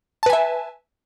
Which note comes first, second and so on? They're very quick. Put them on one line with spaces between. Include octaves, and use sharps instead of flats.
A5 B4 G#5 E5